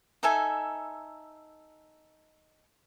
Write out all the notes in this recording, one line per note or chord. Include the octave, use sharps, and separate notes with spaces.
D#4 A4 E5 G#5